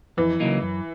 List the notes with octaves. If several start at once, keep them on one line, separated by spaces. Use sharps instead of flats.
F2 E3
C#3 F#3 A#3 D#4
F#2